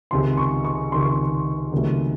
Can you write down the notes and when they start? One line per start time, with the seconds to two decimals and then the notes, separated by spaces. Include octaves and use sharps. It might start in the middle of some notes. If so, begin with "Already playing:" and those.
0.11 C#2 C3 D#3 C6
0.38 C#6
0.64 C#6
0.92 C#2 C3 D#3 C6
1.01 C#6
1.09 C6
1.72 C#2 C3 D#3 F#3 A3